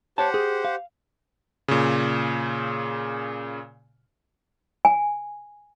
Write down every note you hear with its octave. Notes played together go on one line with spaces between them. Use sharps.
G4 C5 C#5 F#5 A5
G#4
F5
A#2 C#3
G#5